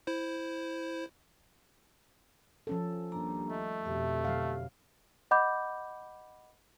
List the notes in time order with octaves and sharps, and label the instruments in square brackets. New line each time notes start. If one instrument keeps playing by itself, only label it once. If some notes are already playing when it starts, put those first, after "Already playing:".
[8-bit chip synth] E4 C5
[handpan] F3 C#4 A4
[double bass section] D#2 G3 [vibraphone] A#3 D4 A#5
[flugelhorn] A3 [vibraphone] D#5
[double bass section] F2 B2 D3 [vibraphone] G4 E5
[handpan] F#3 F5
[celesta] D#5 F#5 B5 D6 G6